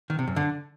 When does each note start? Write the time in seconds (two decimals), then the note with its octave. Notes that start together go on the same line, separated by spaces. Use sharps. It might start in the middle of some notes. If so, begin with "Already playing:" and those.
0.10 D#3
0.19 C3
0.27 F#2
0.36 D3